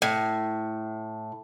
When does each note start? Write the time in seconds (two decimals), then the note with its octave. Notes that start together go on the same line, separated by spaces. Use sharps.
0.02 A2